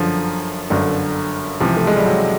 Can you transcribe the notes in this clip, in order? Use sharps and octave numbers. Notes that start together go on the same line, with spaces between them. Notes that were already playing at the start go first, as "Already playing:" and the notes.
Already playing: G1 F#2 D3 F3
G1 F#2 D3
C#2 C3 E3 F3
A3
G#3
G3
F#3